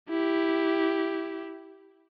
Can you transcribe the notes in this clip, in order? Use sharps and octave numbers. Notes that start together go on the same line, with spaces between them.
E4 G4